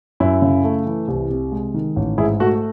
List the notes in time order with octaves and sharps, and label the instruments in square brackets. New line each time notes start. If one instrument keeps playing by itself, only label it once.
[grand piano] F#2 E4
C#3
A3
E3
C2
C3
G#3
D#3
A1
G#2 E4 G#4
A3 F#4